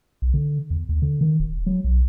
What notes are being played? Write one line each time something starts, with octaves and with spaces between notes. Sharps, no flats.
B1
D3
E2
D#2
D3
D#3
D#1
F#3
B1